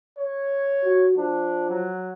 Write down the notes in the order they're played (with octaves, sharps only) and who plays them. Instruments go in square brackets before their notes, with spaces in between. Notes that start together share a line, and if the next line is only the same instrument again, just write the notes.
[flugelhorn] C#5
[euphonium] F#4
[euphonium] F3 [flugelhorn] D4
[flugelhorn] F#3